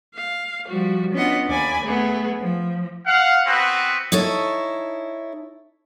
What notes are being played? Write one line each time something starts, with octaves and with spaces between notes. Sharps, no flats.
F5
F3 G3 F#4
B3 C#4 D4 F4 D#5 F#5
D#2 D5 G#5 B5
A3 B3 G#4
F3
F5 F#5
B3 C4 F#4 B4
D#4 E4 A4 C#5